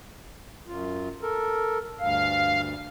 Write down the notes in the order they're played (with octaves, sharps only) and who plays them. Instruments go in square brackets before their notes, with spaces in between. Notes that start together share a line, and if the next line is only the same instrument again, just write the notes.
[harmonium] F#2 F4
A4 A#4
[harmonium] D2 G2 [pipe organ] F5